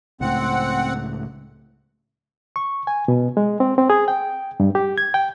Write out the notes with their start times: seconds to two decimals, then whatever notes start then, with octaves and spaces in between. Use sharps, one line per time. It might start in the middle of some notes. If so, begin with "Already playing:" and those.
0.21 C#2 A2 C4 F#5
2.56 C#6
2.87 G#5
3.08 B2
3.37 G#3
3.60 C4
3.78 C4
3.90 G#4
4.08 G5
4.60 G2
4.75 G4
4.98 G#6
5.14 G5